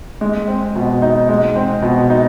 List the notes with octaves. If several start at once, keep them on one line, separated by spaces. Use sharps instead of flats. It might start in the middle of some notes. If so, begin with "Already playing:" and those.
G#3
C4
B2
D#4
G#3
C4
B2
D#4